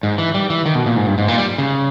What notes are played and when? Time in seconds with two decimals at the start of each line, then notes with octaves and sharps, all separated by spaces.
0.03 G#2
0.18 E3
0.34 G3
0.50 E3
0.66 D#3
0.75 B2
0.86 A#2
0.97 G#2
1.07 G2
1.18 G#2
1.28 A#2
1.38 G3
1.58 C#3